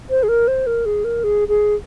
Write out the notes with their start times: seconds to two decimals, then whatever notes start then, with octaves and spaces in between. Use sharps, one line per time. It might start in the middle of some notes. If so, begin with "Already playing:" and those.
0.10 C5
0.23 G#4
0.29 A#4
0.48 C5
0.67 A#4
0.86 G#4
1.04 A#4
1.24 G#4
1.48 G#4